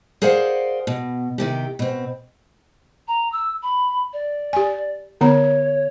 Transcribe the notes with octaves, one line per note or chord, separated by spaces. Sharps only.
G#4 A#4 C5 D5 F5 F#5
B2
C3 D#3 G4
B2 C4
A#5
E6
B5
D5
G4 G#5
D3 B3 C#5 A#5